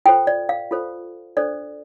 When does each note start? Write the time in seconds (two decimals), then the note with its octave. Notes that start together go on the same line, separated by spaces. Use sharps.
0.06 F4 A4 C5 G5
0.27 D5
0.49 F5
0.71 F4 A4 C5
1.37 D4 A4 C5 D5